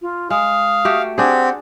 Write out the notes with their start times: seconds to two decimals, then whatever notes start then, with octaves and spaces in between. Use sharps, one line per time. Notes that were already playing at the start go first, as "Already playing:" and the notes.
0.01 F4
0.30 G#3 F5 D#6
0.85 A3 F#4 G4
1.18 C4 D4 G4 G#4 F#5